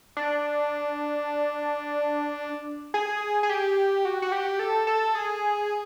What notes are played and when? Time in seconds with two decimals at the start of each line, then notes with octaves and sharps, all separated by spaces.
0.17 D4
2.94 G#4
3.43 G#4
3.49 G4
4.05 F#4
4.22 F#4
4.32 G4
4.59 A4
4.87 A4
5.15 G#4